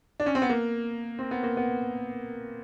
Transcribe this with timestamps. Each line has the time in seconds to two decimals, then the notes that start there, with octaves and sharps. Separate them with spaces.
0.20 D4
0.26 C#4
0.35 C4
0.42 B3
0.49 A#3
1.19 C4
1.31 B3
1.43 A#3
1.57 B3